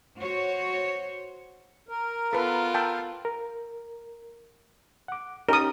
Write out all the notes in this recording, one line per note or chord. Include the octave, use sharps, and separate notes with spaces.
F#4 C5 C#5
A#4
B3 F4 A4 B4
G5 A5 E6
A#4
F#5 D6
C#4 D#4 G4 A#4 D#6